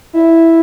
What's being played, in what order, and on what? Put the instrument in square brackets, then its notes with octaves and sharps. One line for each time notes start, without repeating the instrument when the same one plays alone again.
[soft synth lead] E4